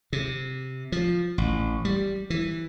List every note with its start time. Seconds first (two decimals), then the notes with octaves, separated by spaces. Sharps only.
0.13 C3
0.92 F3
1.38 A1
1.85 G3
2.30 E3